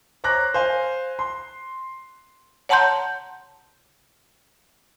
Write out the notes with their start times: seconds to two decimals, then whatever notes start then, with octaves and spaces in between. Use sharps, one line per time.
0.24 C5 C#5 A#5 D6 F#6 A#6
0.54 C5 F5 G#5
1.19 C6
2.69 C#5 F#5 A5 A#5 C6 G6